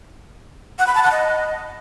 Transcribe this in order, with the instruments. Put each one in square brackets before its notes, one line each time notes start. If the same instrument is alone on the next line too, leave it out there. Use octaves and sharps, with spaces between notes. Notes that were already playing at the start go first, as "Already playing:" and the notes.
[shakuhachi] F#5
B5
A5
F#5
D#5